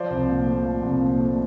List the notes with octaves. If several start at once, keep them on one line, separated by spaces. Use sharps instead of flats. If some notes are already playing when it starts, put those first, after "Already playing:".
Already playing: F3 C5 D5
C2
A#2
A3
F3
C2
A#2
A3